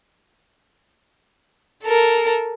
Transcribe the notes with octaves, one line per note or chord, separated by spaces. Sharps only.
A4 A#4